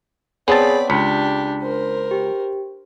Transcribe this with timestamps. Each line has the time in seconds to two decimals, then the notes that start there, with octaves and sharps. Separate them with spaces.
0.48 B3 C4 G#4 C#5 D5 A5 B5
0.90 C#2 D4 G4 B6 C#7
1.62 A#4 C5
2.11 G4